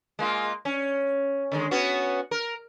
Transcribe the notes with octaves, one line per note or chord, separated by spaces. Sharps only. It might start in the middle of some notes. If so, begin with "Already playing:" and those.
G#3 A#3 F4
C#4
D3 D#3 G#3
B3 C#4 F#4
A#4